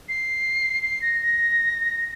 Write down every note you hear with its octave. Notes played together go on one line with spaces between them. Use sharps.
C7
C7
A#6
A#6